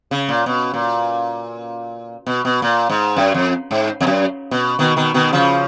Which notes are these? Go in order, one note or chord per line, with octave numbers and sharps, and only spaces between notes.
C#3
A#2
B2
A#2
B2
B2
A#2
G#2
F#2
F2
G#2
F2
F#2
B2
B2 D#3
B2 D#3
B2 D#3
C#3 F3